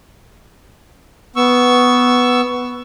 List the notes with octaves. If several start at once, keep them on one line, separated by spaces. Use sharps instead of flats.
B3 C#6 E6